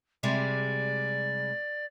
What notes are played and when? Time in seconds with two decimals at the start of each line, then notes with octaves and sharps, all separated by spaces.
0.23 C3 G3 G#3 D5